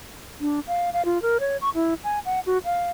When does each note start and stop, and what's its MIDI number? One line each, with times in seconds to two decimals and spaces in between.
0.41 0.60 62
0.67 0.90 77
0.93 1.05 77
1.05 1.21 65
1.22 1.38 70
1.40 1.57 73
1.61 1.70 85
1.75 1.94 64
2.04 2.19 80
2.25 2.40 78
2.46 2.58 66
2.65 2.91 77